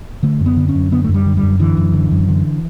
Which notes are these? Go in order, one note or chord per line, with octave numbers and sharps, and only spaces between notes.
D3 A3
F#2
B3
D3
C#4
F#2
D3 B3
F#2 A3
G3
D3
G3
F#2
D3 E3
F#2
D3
F#2
D3